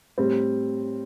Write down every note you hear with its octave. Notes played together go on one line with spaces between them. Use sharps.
A2 G3 C4